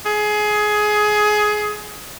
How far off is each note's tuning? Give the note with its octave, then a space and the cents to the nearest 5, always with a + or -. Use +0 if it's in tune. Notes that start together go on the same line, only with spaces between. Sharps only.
G#4 +20